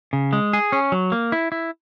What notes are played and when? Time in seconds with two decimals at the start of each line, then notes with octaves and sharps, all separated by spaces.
0.13 C#3
0.33 G#3
0.53 G#4
0.72 C#4
0.92 F#3
1.12 A#3
1.32 E4
1.52 E4